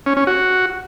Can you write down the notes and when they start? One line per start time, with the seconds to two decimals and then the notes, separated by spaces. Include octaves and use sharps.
0.06 C#4
0.17 C#4
0.27 F#4